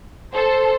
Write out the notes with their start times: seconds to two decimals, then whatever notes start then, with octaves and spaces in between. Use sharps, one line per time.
0.33 A4 C5